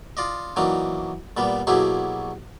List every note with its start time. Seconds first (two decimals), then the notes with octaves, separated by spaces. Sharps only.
0.17 F4 D5 D#5
0.56 E3 F#3 A#3 D4 D#4
1.37 A#2 G3 A#3 B3
1.67 B2 F#3 A#3 E4 G4 G#4